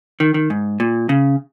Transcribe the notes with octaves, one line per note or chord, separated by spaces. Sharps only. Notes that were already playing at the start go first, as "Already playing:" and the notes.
D#3
D#3
G#2
A#2
C#3